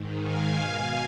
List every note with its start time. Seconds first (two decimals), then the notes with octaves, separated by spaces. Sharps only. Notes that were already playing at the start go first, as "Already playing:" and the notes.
Already playing: G#2 D#3
0.22 F5 G#5
0.57 B2